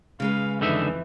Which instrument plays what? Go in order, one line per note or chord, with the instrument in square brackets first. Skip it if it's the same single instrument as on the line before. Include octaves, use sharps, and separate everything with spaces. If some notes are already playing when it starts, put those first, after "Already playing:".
[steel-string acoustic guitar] C#3 G#3 B4 [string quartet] F5
[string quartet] F2 E3 [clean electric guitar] D3 D#4 E5